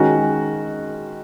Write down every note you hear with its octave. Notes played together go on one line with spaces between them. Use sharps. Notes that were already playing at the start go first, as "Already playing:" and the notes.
Already playing: D#3 G#3 C#4 F#4